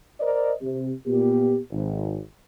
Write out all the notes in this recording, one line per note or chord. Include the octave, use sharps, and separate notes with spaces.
A#4 C5 D5 D#5
C3
A#2 B3 G4
G#1